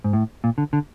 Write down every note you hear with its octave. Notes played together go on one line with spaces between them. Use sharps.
G#2
A2
A#2
D3
D3